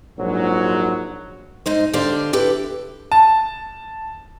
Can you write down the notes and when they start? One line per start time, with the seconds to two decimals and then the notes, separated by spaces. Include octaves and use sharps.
0.19 A#1 G#2 F#3
1.66 G#2 D#4 C5
1.93 D3 G4 C5 D5 F5
2.33 E4 G4 A4 B4
3.12 A5